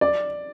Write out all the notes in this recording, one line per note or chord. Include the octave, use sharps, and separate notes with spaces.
D5